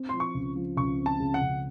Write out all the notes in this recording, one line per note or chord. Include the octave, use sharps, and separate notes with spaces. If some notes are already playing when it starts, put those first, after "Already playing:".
Already playing: C4
F3 C6
C#6
C#2
F3
C#2 C#6
C4
A5
C#3
F#5
C#2